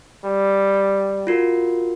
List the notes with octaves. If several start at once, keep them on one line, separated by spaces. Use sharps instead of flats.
G3
F4 F#4 A#4